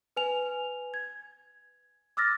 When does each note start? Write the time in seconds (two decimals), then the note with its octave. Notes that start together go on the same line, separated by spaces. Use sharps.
0.17 B4 G#5 F7
0.94 G#6
2.17 D6 E6 F6 A6 A#6